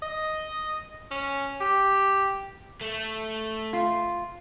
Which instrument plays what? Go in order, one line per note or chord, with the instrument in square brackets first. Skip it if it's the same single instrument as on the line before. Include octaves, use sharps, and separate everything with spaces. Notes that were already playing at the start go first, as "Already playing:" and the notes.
[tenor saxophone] D#5
C#4
G4
[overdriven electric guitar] A3
[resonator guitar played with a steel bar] F4